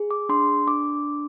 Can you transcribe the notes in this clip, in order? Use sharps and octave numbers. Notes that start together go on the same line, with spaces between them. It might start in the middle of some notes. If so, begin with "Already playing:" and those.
Already playing: G#4
D6
D4 C6
D4 D6